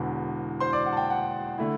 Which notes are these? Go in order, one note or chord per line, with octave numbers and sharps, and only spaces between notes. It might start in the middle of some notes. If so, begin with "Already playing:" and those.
Already playing: E1 E2 D3 B4
C5 C6
D5 D6
F#5
A5
G5
F#5
D3 A3 E4